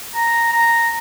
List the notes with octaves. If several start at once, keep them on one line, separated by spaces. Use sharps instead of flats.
A#5
A#5